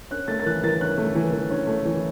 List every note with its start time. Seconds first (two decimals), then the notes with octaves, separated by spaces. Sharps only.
0.11 C#4 F#6
0.28 A3 A6
0.40 A6
0.46 E3 F#6
0.64 E3 A6
0.81 C#4 F#6
0.98 A3
1.15 E3
1.33 E3
1.51 C#4
1.67 A3
1.85 E3